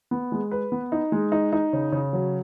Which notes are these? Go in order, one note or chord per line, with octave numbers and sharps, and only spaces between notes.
B3
G#3
B4
B3
D#4
G#3
D#4
D#4
C#3
C#3
F#3